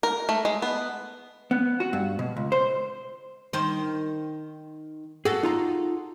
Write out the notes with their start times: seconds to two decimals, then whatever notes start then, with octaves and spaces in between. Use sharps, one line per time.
0.03 A#4
0.29 A3
0.45 G#3
0.62 B3
1.51 B3
1.80 F#4
1.93 G2
2.19 B2
2.37 C#2
2.52 C5
3.53 D#3 C5
5.25 F#4 G#4 A4
5.43 D#4 F4 A#5